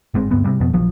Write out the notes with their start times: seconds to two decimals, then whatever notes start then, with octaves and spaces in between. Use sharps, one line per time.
0.14 G1 G#2 G#3 C4
0.31 D2 G2 G#3 B3
0.44 C3 G3
0.60 F2 B2
0.74 A#1 F3 F#3